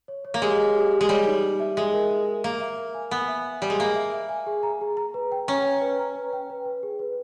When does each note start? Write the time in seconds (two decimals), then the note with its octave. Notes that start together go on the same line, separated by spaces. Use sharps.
0.08 C#5
0.25 C#5
0.34 A#3
0.42 G#3 G4
0.59 C#5
0.75 G4
0.92 G4
1.01 G#3
1.09 G3 C#5
1.27 D#4
1.43 D#4
1.60 E5
1.77 G#3 E5
1.94 A#4
2.10 A#4
2.28 A#4
2.44 A#3 A#4
2.61 E5
2.79 A#4
2.94 G#5
3.11 B3 G#5
3.28 E5
3.46 E5
3.62 G3 G#5
3.70 G#3
3.79 A#3 A#4
3.96 E5
4.13 E5
4.29 G#5
4.47 G#4
4.63 A#5
4.81 G#4
4.97 A#5
5.14 B4
5.32 G5
5.48 C#4 A#5
5.65 G5
5.81 B4
5.99 A#5
6.15 B4
6.33 G5
6.50 B4
6.66 B4
6.83 G#4
6.99 B4